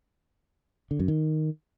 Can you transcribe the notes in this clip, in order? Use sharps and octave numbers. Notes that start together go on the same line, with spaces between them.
D3
F#2
D#3